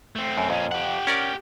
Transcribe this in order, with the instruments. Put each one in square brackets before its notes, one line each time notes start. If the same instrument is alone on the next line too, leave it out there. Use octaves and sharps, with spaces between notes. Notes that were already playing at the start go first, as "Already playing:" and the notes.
[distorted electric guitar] A3 C4
[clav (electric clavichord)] F#2
[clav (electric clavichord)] F2 [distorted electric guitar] A#2 C#4
[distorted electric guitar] G4 F#5
[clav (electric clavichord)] C#4 A#4 D5